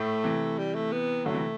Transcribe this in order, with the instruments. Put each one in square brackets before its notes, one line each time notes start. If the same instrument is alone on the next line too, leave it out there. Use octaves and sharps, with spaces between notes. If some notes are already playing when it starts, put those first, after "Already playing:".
Already playing: [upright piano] A2 [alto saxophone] A3
[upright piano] C3 E3
[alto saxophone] G3
A3
B3
[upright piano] D3 F#3 [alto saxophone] A3
[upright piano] C3 E3